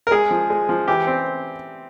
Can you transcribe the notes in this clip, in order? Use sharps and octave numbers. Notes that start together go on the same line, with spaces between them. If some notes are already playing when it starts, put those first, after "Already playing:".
A#4
G#3 G#4
F3
G#3
F3
E3 G4
C4